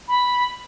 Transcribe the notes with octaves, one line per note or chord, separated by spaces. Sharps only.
B5